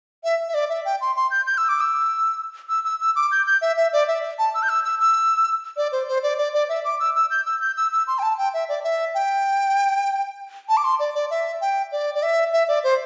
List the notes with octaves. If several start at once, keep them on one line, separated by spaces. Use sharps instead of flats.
E5
E5
D5
E5
G5
C6
C6
G6
G6
E6
D6
E6
E6
E6
E6
D6
G6
G6
E5
E5
D5
E5
A5
E6
G6
E6
E6
E6
D5
C5
C5
D5
D5
D5
E5
D6
E6
E6
G6
E6
G6
E6
E6
C6
G5
A5
G5
E5
D5
E5
G5
A5
D6
C6
D5
D5
E5
G5
D5
D5
E5
E5
D5
C5